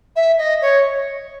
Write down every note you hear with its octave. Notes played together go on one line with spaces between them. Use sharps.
E5
D#5
C#5